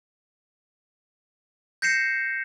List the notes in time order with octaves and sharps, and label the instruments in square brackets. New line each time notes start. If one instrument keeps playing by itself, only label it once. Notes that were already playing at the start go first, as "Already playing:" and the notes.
[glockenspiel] G6 A#6 C7 C#7 E7